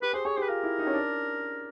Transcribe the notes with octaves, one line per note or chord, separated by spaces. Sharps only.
G4 B4
G#4 C5
G#4 C#5
G4 C5
B4
F4 A#4
E4
D#4
C#4
D4